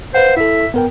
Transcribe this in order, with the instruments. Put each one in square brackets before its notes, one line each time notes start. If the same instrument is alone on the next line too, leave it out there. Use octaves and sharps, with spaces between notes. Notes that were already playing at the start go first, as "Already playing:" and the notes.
[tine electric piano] B4 F5 F#5 [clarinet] C5
[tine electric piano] E4 A4 [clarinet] E5
[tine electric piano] B3 A#4 G5